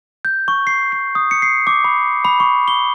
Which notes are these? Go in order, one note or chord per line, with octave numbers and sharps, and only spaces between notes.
G6
C#6
C7
C7
D#6
C#7
C7
D6
B5
B5
C#6
G7